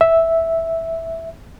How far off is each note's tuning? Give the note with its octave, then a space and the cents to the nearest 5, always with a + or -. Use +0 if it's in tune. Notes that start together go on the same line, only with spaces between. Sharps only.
E5 -5